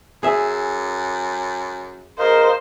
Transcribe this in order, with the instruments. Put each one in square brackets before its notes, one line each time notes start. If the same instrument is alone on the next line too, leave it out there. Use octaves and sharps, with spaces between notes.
[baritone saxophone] F#2 [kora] G#4 E5
[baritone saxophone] E2 [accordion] A#4 D#5 F5 [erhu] C5